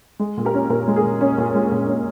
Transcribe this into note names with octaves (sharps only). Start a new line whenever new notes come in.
G#3
A#2
G4 A#4
C#4
A#2 G4 A#4
G#3
G#4
A#2
C#4
A#2
G#3
A#2
C#4